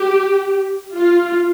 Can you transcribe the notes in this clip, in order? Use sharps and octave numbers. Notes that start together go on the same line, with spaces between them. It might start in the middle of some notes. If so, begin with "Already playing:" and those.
Already playing: G4
F4